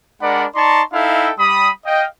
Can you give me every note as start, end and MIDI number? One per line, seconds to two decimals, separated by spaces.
0.22 0.46 56
0.22 0.46 62
0.22 0.46 70
0.22 0.46 74
0.22 0.46 78
0.22 0.46 83
0.56 0.83 63
0.56 0.83 74
0.56 0.83 81
0.56 0.83 82
0.56 0.83 84
0.56 0.83 85
0.93 1.31 63
0.93 1.31 64
0.93 1.31 69
0.93 1.31 76
0.93 1.31 77
0.93 1.31 79
1.39 1.70 55
1.39 1.70 83
1.39 1.70 87
1.85 2.06 75
1.85 2.06 77
1.85 2.06 79